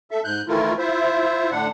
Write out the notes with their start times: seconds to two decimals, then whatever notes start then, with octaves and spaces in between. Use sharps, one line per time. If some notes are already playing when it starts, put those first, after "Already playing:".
0.11 A4 E5
0.24 G#2 F#6 G6
0.48 D#3 E3 A3 E4 F4 A#4
0.78 E4 F4 C5 E5
1.51 A2 D3 D4 F#5